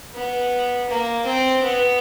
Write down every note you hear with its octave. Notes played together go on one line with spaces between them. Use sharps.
B3
A#3
C4
B3